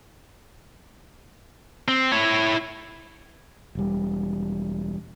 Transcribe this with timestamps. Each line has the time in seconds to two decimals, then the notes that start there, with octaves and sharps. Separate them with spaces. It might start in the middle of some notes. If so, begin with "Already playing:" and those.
1.88 C4
2.12 E4 C#5
3.75 E1 G3